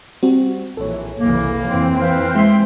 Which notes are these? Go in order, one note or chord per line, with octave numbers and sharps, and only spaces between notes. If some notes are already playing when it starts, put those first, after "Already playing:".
G3 C4 F#4
A#1 E3 A4 C#5
F#1 C2 E3 A#3
F2 E3 C4
B4 C5 F5
G#3 A#3 E5 G5 C6